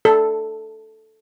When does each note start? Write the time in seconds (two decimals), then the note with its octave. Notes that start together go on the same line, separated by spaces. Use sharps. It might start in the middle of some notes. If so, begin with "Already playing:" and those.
0.05 A4